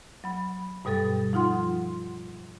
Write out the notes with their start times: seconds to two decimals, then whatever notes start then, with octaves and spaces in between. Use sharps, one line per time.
0.24 F#3 B5
0.85 G2 B2 G3 A4 A6
1.33 F3 D#4 F4 F#5 C6